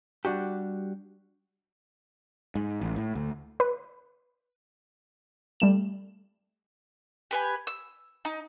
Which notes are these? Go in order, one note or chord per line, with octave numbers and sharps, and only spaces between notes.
G3 D4 F#4 G4
G#2
A1
A2
D2
B4
G3 A3 E7
G4 B4 G#5
E6
D#4